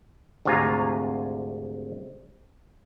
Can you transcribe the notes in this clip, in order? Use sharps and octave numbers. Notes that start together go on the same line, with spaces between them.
G#1 D2 C3 F4 G#5 A#5